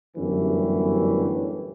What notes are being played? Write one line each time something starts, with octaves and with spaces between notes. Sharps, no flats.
G1 F#2 A2 D3 E3 G3